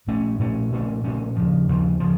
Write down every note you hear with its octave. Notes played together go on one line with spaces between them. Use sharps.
A#2 A3 C#4
A#2 A3 C#4
A#2 A3 C#4
A#2 A3 C#4
D#2 C#3 F3
D#2 C#3 F3
C#3 F3